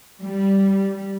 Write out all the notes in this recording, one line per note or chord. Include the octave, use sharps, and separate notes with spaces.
G3